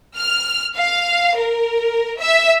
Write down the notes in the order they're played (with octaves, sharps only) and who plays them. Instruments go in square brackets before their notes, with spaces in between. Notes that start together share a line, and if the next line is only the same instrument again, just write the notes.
[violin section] F6
F5
A#4
E5